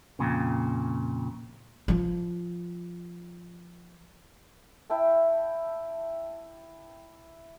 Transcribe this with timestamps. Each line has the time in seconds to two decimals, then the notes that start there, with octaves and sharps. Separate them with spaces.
0.19 F2 A#2 C#3
1.88 F3 F4
4.90 E4 E5 G5 A5